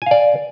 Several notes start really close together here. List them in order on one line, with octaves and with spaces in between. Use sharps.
G#5 F5 D5